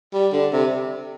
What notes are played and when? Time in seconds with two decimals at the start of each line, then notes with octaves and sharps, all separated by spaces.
0.14 G3
0.33 D3
0.52 C3